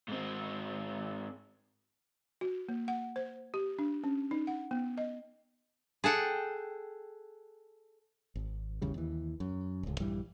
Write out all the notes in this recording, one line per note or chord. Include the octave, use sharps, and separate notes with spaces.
G#2 C4
F#4
A#3
F#5
C5
G4
D4
C#4
D#4
F#5
B3
D#5
G#4 A4 F#5 G5
G#1
G#1 E2 C#3 G3
D#2 E3
F#2
D1 C#2
A#1 G2 E3 G3